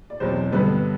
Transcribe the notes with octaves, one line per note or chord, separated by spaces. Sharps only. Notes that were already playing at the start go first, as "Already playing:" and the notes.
D5
E2 B2 F#3 C4 C5
G2 D3 G3 B3 B4